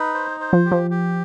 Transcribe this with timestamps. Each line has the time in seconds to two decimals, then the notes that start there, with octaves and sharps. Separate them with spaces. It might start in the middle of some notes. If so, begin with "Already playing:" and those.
Already playing: D#4 B4
0.14 C5
0.40 C5
0.53 F3
0.66 G4
0.72 F3
0.91 G4